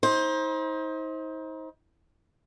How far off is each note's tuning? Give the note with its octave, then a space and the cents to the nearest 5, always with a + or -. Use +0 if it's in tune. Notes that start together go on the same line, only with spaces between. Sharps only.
D#4 +40 C5 +15